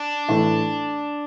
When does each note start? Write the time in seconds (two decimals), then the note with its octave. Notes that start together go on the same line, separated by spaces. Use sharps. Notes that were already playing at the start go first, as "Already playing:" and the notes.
Already playing: D4
0.29 A2 E3 A3